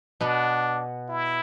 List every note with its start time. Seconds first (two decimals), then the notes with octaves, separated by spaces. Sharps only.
0.21 B2 B3 D4
1.09 E4